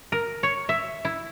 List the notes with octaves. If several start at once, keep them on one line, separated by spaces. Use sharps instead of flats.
A#4
C#5
E5
E4